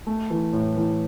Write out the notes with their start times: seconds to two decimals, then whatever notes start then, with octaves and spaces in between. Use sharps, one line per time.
0.07 A3
0.30 E3
0.53 A2
0.77 E3